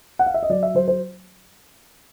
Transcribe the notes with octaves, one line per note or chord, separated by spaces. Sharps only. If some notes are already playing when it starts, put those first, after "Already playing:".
F#5
F5
E5
D#5
F#3 D5
E5
F#3 C5
C5